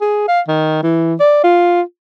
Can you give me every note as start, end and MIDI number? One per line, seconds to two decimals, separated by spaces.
0.01 0.26 68
0.28 0.41 77
0.48 0.80 51
0.83 1.15 52
1.20 1.44 74
1.44 1.81 65